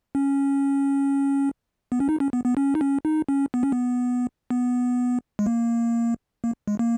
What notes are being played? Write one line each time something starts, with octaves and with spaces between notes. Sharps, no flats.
C#4
B3
C#4
D#4
C#4
B3
B3
C#4
D#4
C#4
D#4
C#4
B3
C#4
B3
B3
G#3
A#3
A#3
G#3
A#3